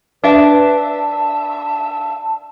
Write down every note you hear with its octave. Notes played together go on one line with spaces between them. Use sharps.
D4 B4 E5
A5